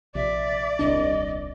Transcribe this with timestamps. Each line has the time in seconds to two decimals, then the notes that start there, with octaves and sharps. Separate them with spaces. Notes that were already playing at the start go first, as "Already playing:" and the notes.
0.15 A#1 C3 D5 E5
0.79 D#1 C2 D4 D#5